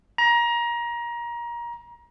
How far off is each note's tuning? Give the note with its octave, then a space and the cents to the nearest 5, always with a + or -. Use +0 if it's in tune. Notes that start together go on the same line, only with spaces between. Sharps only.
A#5 +25